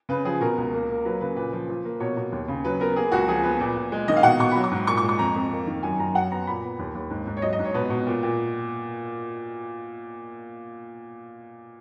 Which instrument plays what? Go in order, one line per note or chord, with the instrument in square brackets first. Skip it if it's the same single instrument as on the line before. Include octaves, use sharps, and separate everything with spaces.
[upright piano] C#3 B4
F3 G#4
B2 A#4
C#2
A#3
A#3
F#3 B4
C#3 B4
A#2 B4
F3
F3
A#3
B2 C#5
B2
D#2
C#3
F#3 B4
B3 A#4
A#3 G#4
C#2 F#4
F3 G#4
B3 B4
A#2
A#2
G#3
D#3 D#5
F5
B2 F#5
B2 C#6
F#3 B5
C#6
G#2
A#2 C#6
C#6
G#3
C#6
F2 A#5
F2
A#3
D#3
F#2 G#5
F#2 A#5
F#3 F#5
B3 A#5
A#2 B5
B3
D#2
D#2
G#2
G#2
C#5
F#3 D#5
D#5
G#2
C#5
B2 B4
B2
A#2
A#2